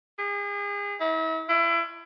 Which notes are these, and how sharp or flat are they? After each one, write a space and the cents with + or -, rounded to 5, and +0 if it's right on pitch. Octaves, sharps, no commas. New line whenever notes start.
G#4 -35
E4 -40
E4 +30